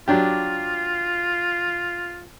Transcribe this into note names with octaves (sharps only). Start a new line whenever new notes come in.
F#3 D4 F4 G4